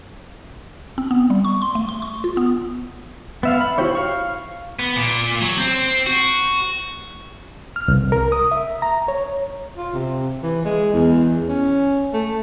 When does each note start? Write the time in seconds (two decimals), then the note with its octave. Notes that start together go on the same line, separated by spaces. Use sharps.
0.98 C4
1.11 B3
1.30 G3
1.45 C#6
1.62 C6
1.75 A3
1.89 C6
2.02 C#6
2.24 F4
2.37 B3
3.43 B3 E5 F5
3.61 B5
3.78 E4 F#4 G4 C5 C#5
3.95 F5 C#6
4.79 B3
4.96 A#2
5.41 F#3
5.58 C4
6.06 F#4
7.76 F6
7.88 C2
8.12 A#4
8.32 D#6
8.51 E5
8.82 A#5
9.08 C#5
9.77 F4
9.94 C3
10.43 E3
10.66 G#3
10.94 E2
11.49 C#4
12.13 A3